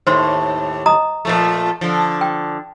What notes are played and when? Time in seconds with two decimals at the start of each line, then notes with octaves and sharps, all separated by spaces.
0.07 D#2 A2 C5 C6
0.86 D#5 A#5 D#6
1.25 A#2 F3 A3
1.81 D3 F3
2.21 G5